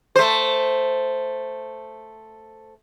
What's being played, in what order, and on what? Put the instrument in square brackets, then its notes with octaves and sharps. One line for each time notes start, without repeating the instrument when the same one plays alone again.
[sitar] A3 C5